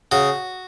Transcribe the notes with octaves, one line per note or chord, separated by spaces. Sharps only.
C#3 F#4